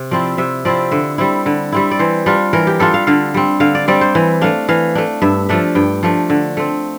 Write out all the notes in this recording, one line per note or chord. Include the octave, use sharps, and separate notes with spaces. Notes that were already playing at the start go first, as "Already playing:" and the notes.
Already playing: C3
F3 C4 E4 D5
C3 E5
F3 C4 E4 D5
D3 E5
G3 C4 E4
D3
G3 C4 E4
D5
E3 C5
G3 D4 F4
E3 A#4
G4
G3 D4 F4 A4
F5
D3 F5
G3 C4
D3 F5
D5
G3 C4 D5
C5
E3
A3 D4 F5
E3 F5
A3 D4
G2 E5
F3 A3 D4 E5
G2 G5
F3 A3 D4
D3
A3 C4